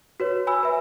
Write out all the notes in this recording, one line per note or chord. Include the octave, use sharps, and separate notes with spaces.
F#4 B4 C#5
G#5 B5 E6
B4 E5